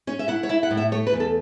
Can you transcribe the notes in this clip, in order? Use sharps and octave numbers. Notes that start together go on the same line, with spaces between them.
C#4 C#5
E5
E4 F#5
C#5
E4 E5
F#5
A2
E5
A3 C#5
B4
E2
A4